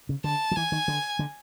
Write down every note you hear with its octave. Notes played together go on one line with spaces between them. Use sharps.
C#3
D3 A5
F3
E3 G#5
D#3
D3
D3